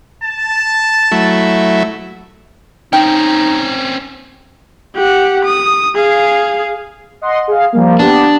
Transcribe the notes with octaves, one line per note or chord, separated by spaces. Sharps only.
A5
F#3 A3 E4
C4 C#4 D#4 G5
G4 F#5
D#6
G#4 F5
D#5 F#5 C6
G#4 F5
F3 G3 A#3
B3 D4 G4